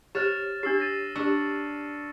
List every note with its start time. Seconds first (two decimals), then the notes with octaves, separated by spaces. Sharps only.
0.15 G4 C5 C#5 F6 A6 E7
0.63 D4 G4 E6 C7
0.78 A6 A#6 D#7
1.16 D4 G4 C#6 E6 C#7